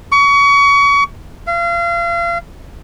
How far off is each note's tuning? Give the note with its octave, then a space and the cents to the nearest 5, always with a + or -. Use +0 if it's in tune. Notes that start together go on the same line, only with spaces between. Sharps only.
C#6 +30
F5 -35